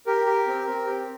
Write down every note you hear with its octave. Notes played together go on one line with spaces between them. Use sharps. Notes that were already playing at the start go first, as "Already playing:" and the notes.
G4 A#4
G4
C4
C4
G4